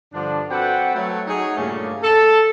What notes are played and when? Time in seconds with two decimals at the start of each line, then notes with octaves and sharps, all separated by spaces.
0.13 G2 D3 F3 D4
0.51 C4 F#4 A4 B4 F#5 G5
0.95 F#3 A3
1.27 D#4 F#4 G#4 C#5
1.57 G2 A#2 C#3 A3 A#3
2.02 A4